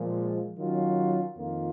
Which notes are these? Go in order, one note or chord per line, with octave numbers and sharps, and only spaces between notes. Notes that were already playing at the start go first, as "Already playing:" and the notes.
Already playing: A#2 F3 G#3
D#3 F#3 C#4 F4
F2 D#3 A#3 F4